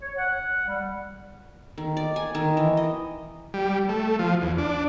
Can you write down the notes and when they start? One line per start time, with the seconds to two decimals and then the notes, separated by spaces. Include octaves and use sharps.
0.01 C#5
0.18 F#5
0.67 G3
1.78 D#3
1.97 D5
2.16 G#5
2.35 D#3
2.57 E3
2.77 D#5
3.54 G3
3.89 A3
4.19 F3
4.42 E2
4.58 D4